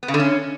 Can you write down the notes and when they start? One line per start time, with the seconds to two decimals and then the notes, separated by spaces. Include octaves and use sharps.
0.03 B3
0.08 C#3
0.14 D3
0.20 C#4